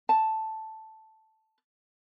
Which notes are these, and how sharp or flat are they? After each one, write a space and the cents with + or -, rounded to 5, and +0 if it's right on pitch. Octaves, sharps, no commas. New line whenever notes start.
A5 +0